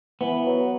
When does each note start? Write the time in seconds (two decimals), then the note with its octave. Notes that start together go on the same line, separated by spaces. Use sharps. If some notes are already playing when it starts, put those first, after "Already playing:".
0.21 E3 B3
0.46 F#3